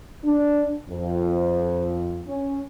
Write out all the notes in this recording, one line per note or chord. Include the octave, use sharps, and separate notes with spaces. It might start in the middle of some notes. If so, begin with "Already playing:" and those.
D4
F2
C#4